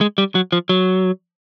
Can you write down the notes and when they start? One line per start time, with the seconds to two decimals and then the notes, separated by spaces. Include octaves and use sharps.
0.01 G#3
0.18 G3
0.35 F#3
0.52 F3
0.69 F#3